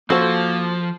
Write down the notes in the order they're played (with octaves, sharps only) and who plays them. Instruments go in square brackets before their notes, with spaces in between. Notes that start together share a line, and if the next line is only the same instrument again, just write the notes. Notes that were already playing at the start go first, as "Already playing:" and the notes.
[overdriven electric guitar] F3 [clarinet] A#3 [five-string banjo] F#4 A4 C5